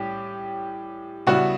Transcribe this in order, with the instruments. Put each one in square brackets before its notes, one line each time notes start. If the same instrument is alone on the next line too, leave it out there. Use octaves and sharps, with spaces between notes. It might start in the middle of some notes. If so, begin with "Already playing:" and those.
Already playing: [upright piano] A2 G3 C#4 [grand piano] G4
[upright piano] C#3 G3 B3 E4 [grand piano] F#4